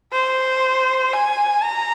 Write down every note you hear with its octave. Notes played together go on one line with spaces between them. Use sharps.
C5
G#5
A#5